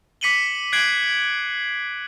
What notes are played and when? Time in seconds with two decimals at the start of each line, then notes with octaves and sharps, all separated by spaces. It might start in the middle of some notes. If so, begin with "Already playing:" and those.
0.21 D6 B6 C#7 D#7 F#7 G7
0.73 F#6 G#6 C7 D7 F#7